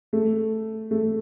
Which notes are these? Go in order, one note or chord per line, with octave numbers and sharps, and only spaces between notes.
A3
A3